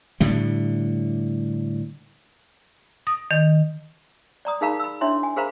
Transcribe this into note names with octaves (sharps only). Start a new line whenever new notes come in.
A2 D3 G3
D#6
D#3
D5 A#5 D#6
D#4 G#4 A#4 F5 A#5 B5
B5 E6
D4 E4 C#5 E5 C6
G#5
G#4 A#4 C5 F5 A#5 B5